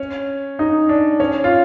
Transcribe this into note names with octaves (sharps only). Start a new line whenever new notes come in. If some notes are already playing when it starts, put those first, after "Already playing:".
Already playing: C#4
D#4
D4
C#4
F4